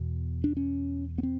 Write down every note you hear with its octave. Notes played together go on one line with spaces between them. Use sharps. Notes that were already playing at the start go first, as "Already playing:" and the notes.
Already playing: E2 B2
D4
C#4
B3
C4